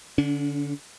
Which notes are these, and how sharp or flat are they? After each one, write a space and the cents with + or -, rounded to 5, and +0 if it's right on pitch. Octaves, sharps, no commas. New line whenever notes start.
D3 -20 C#4 +40